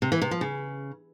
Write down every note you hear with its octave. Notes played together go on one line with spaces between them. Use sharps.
C3
E3
C3
F3
C#3